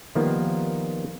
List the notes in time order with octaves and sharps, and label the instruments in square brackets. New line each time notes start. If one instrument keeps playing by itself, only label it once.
[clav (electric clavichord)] D#3 F3 G3 A#3 B3 F4